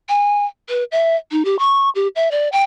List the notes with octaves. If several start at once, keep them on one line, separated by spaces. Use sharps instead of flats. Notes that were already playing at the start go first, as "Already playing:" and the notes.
G#5
B4
E5
D#4
G4
C#6
G4
E5
D5
G5